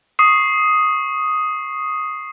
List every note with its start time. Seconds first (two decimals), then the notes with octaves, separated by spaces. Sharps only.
0.19 C#6 D#6 C7